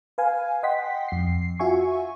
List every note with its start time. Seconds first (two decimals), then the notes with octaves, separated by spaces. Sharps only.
0.18 B4 F5 G#5
0.63 D#5 F#5 G5 C6 B6
1.08 F2 C7
1.59 F4 F#4 E5 G#5 C#6